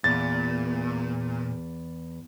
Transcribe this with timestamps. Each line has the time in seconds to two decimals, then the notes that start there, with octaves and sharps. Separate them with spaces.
0.04 E2 A#2 A6